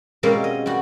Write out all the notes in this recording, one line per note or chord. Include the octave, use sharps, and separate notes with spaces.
B2 G3 G#3 A#3 C4 C#4
D#5
G3 F#4